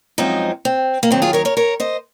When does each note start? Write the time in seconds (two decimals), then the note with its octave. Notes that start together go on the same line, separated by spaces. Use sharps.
0.18 F#2 F3 G#3 C4 D#4
0.65 C4
1.03 A#3
1.11 D#2 D#3 F#3 C4
1.22 F4 G#4
1.33 A#4 C#5
1.45 A#4 C#5
1.57 A#4 C#5
1.80 C5 D#5